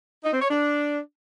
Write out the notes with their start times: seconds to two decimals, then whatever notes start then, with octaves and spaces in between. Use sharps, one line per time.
0.24 D#4
0.33 C4
0.41 C#5
0.50 D4